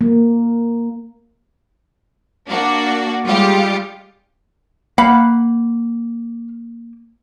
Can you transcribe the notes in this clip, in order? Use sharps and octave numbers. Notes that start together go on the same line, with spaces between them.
A#3
A#3 D4 F#4
G3 G#3 F4 G4
A#3 F5 F#5 B5